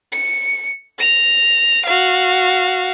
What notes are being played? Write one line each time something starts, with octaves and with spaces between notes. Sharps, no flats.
C#7
A#6 F7
F#4 F5